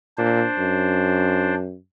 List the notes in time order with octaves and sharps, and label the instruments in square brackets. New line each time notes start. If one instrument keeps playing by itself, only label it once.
[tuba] A#2 [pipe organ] D4 C5
[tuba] F#2